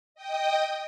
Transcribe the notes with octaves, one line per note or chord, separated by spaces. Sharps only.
D#5 G5 D#6